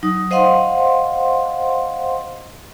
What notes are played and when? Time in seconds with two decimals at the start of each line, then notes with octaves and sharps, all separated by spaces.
0.03 F#3 D#4 D#6
0.31 C5 D#5 F5 F#5 C6